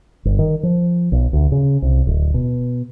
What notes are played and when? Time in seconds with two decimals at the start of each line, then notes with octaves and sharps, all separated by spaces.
0.25 G1
0.39 D#3
0.63 F3
1.12 B1
1.33 D2
1.52 C#3
1.82 C2
2.07 D1
2.34 B2